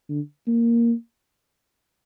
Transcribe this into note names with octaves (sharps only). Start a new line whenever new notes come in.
D3
A#3